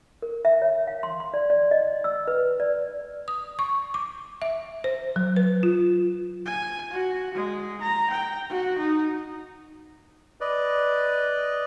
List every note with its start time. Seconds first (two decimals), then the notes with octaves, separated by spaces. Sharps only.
0.22 A#4
0.45 E5
0.62 C#5
0.87 F5
1.03 C6
1.20 C6
1.34 D5
1.50 D5
1.71 D#5
2.04 E6
2.28 B4
2.60 D5
3.28 D#6
3.59 C#6
3.94 D6
4.42 E5
4.84 C5
5.16 F#3
5.36 B4
5.63 F4
6.46 G#5
6.91 F#4
7.35 G#3
7.82 A#5
8.11 G5
8.49 F#4
8.79 D#4
10.41 B4 D5 D#5